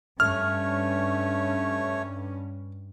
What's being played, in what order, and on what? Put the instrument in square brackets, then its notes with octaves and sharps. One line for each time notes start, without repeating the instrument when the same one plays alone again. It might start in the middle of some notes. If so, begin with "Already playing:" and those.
[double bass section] G2 C#4 [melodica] A3 C#5 [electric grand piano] F6